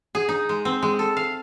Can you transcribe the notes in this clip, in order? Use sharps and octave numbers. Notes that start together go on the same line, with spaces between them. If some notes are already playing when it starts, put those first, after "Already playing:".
G#4
D#4
G#3
C4
G#3
A4
F5